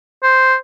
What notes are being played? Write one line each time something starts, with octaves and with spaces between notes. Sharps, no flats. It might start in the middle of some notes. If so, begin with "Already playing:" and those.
C5